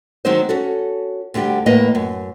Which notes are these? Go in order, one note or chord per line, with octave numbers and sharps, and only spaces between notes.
D#3 F#3 G#3 C4 D#4 C5
C#4 F#4 A4
D2 D3 G3 G4
E2 A2 A#3 E4 B4 D#5
F#2